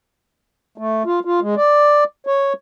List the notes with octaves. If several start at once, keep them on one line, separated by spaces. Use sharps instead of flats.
A3
F4
F4
G#3
D5
C#5